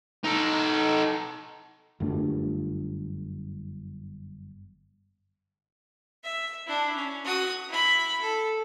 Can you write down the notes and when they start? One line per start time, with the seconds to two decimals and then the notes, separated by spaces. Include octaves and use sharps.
0.24 D#4 A4
2.00 G1 F#2 A3 D4
6.24 E5
6.67 D4 E4
6.96 C#4
7.25 F#4 D#6
7.69 E4 B5
8.20 A4